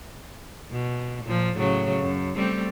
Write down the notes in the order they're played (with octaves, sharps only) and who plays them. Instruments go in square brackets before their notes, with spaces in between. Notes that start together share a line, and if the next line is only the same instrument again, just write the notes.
[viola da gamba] B2
A#2 F3
A2 C#3 F#3
F#2
G3 A3 C4